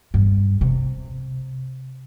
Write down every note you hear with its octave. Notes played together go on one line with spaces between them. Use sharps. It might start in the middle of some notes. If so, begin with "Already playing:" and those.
G2
C3